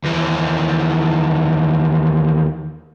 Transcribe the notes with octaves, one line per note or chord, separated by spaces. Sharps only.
D#2 E3